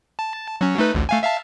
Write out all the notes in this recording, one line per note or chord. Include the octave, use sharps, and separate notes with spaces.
A5
F#3 C#4
A3 D#4 B4
A1 D2
A3 F5 G#5
E5 F5 A5